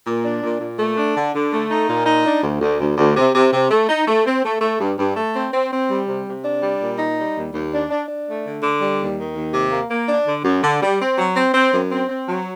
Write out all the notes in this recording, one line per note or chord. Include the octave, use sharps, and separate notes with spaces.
A#2
D4
A#2
A#2
A3
D4
D3
D3
A3
D#4
A#2
D#4
D4
D2
D2
D2
D2
C3
C3
C3
A3
D#4
A3
C4
A3
A3
G2
G2
A3
C4
C4
C4
G3
C3
C3
D4
G3
A#2
D#4
G3
D#2
D#2
D4
D4
D4
A3
D3
D3
G3
D#2
D#3
D#2
C3
A#3
A#3
D4
D3
F#2
D3
G3
C4
F#3
C4
C4
F#2
C4
C4
F#3